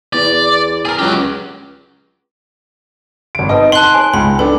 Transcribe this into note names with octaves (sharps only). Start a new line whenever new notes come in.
E2 D5
G#4 A#4
C#2 F#3 G4
G#1 D7
C4 D#4 B4 D#5
F#5 A5 C6 F#6 F#7
G#4 C#5 G#5
C#2 G5 B5
B3 D4 A4